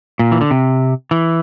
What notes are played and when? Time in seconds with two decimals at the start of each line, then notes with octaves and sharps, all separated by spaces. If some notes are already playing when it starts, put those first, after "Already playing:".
0.19 A#2
0.32 E3
0.41 D3
0.51 C3
1.11 E3